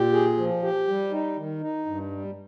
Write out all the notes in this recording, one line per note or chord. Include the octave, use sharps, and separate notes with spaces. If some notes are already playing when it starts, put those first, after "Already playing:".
Already playing: A#2 G4
G#4
F3
G4
G3
D#4
D#3
D#4
G2
G3